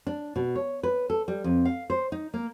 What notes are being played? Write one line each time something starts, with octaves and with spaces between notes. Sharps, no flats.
D4
B2
C#5
B4
A4
G3
F2
F5
C5
D#4
A#3